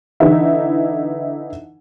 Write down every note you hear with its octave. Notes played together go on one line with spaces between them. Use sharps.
D3 E3 D#4 E4